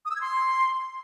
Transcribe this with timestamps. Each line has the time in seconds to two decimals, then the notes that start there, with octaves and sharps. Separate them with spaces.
0.05 D#6
0.11 E6
0.16 G#6
0.21 C6